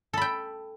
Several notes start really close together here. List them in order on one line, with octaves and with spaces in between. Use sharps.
A4 B5 G5